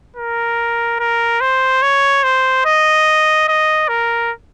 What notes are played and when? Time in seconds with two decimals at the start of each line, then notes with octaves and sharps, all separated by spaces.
0.16 A#4
1.00 A#4
1.41 C5
1.82 C#5
2.23 C5
2.65 D#5
3.48 D#5
3.88 A#4